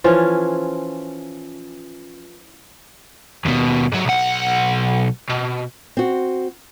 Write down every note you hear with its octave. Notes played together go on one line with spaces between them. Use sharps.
E3 F3 C#4 F4
D#2 B2
G#2 F#3
B1 F#5
B2
C4 F#4